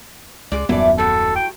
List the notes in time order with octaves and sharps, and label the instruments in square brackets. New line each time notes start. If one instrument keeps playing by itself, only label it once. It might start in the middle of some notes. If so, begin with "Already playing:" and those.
[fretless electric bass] C#2 [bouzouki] G#3 D5
[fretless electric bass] D#1 F#2 B3 [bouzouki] E3 A3 D5
[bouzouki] A2 F#3 F#4 [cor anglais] A4
[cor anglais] G5